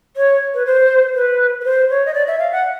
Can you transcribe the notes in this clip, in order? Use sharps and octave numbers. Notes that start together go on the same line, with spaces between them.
C#5
B4
C5
B4
B4
C5
C#5
D#5
D5
E5
F5
F#5